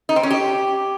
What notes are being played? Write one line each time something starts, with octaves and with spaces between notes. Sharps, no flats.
D#4
C4
C#4
G4